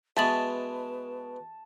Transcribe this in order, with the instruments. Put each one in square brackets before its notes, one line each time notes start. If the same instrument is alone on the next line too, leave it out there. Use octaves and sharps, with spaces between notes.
[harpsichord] B2 G#3 B3 [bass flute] B4 [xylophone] E5 A6 F#7 [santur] A5